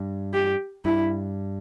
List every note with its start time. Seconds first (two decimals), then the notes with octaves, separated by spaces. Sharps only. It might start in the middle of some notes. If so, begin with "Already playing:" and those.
Already playing: G2
0.33 G4
0.85 G2 E4